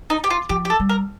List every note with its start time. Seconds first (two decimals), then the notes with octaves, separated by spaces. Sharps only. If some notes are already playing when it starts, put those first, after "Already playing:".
0.10 D#4
0.24 G4
0.30 F4
0.49 F3 G4
0.65 G4
0.70 A4
0.80 G3
0.89 A#4